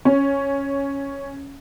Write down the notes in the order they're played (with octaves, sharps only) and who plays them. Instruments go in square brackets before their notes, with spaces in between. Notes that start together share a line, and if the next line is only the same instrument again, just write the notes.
[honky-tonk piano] C#4